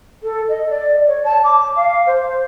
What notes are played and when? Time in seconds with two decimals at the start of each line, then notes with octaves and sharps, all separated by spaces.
0.23 A4
0.49 D#5
0.70 D5
1.07 C#5
1.25 A5
1.44 D6
1.76 F5
2.07 C5